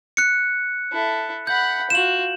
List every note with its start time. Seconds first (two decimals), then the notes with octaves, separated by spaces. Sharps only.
0.17 F#6 C#7
0.93 E4 A4
1.47 F#5 B5 G6
1.90 F4 F#4 E7 F#7